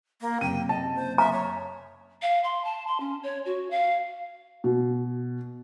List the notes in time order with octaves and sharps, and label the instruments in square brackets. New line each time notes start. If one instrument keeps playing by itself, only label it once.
[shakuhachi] A#3
[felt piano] F#1 C3 [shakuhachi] G5 [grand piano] D#7
[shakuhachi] D#5 [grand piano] A5
[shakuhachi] C5
[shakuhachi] E5 [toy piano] A#5
[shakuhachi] C#5
[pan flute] F5
C6
A5
C6
C#4
C#5
F#4
F5
[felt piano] B2